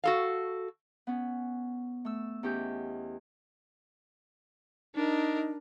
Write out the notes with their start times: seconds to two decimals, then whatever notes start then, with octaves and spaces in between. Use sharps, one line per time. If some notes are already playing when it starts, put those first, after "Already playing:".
0.04 F#4 A4 F5
1.07 B3 C#4
2.05 A3 E6
2.43 E2 C#4 G4 D#5 G6
4.95 D4 D#4 A#4